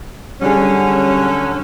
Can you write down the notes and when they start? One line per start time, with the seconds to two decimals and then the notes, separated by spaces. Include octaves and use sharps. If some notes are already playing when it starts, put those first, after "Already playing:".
0.42 D3 F#3 G3 C#4 D4 G#4